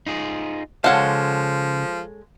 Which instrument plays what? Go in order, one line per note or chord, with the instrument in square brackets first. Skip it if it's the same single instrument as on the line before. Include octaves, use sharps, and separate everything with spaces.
[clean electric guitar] D#4 F4 G#4
[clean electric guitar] C#3 A5 [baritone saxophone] F3 [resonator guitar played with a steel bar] G#3 A4 C#5 [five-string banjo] F5 F#5